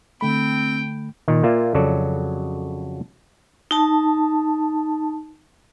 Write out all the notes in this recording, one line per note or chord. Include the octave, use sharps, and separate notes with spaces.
D3 A3 C4 G5 B5
A#2 D#3
A#2 A#3 F4 D5 E5
F2 C#3 F#3 F#4 A4 D5
D#4 A5